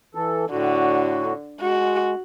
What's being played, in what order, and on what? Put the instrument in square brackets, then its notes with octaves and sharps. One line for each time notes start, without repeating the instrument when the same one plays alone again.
[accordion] E3 A4
[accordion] A2 F#4 [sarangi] D3
[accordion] G#3 [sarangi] F#4